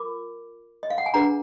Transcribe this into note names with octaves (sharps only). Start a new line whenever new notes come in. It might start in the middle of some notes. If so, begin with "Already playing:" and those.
Already playing: F4 A#4 D6
D#5
F5
F#5
G#5
D4 G#4 B4 F#5 A#5